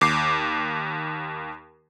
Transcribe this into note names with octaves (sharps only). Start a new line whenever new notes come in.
D#2 D6 C7